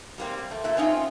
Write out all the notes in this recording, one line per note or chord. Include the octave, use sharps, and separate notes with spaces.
G3 A#3 C4
A3
A#2 E5
C4 C#4 D#4 F4